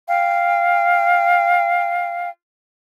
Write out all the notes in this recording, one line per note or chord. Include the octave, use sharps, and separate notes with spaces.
F5 G5